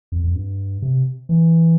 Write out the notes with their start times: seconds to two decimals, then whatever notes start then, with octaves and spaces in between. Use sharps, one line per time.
0.12 F2
0.24 F2
0.36 G2
0.82 C3
1.29 E3